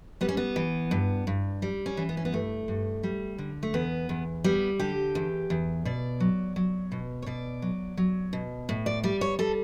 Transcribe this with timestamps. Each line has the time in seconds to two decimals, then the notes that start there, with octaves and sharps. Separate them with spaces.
0.21 G3 B3
0.29 C#4
0.37 B3
0.56 E3
0.91 G2
1.27 G2
1.62 G3
1.86 C#4
1.97 E3
2.09 B3
2.17 C#4
2.25 B3
2.32 G2 A3
2.68 G2
3.03 G3
3.38 D3
3.63 A3
3.74 E2 B3
4.09 E2
4.44 G3 B3
4.79 D3 G4
5.15 E2
5.50 E2
5.85 B2 D5
6.20 F#3
6.56 F#3
6.92 B2
7.22 C#5
7.26 B2 D5
7.62 F#3
7.97 F#3
8.33 B2
8.69 A2
8.86 D5
9.03 G3 D5
9.21 C#5
9.39 G3 A4